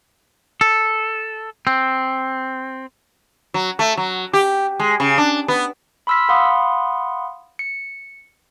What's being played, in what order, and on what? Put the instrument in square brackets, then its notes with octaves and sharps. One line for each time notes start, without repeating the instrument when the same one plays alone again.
[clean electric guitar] A4
C4
[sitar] F#3
A3
F#3
G4
G#3
C#3
D4
B3
[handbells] B5 C6 E6 F6 B6
F5 F#5 B5 C6 D#6
C#7